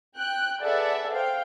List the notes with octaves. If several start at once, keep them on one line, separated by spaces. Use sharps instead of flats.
G5 F#6
G#4 A4 B4 D5 E5 F#5
C5 F5 G5